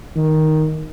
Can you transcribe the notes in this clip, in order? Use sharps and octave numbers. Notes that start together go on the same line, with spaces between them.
D#3